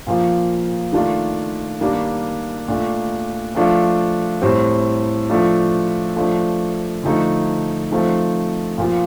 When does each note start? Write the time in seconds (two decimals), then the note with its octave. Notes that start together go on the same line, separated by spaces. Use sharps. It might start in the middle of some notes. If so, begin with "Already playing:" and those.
0.07 A#2 F3 A#3
0.93 D#3 A3 D4 F4
1.80 D#3 G3 A#3 D4
2.68 A#2 A3 D4
3.55 F3 A3 D4 F4
4.42 A2 G3 C4
5.30 F3 A3 D4 F4
6.16 F3 A3 D4
7.03 D3 F3 A3 D#4
7.91 F3 A3 C4 D#4
8.78 A#2 F3 A#3 F4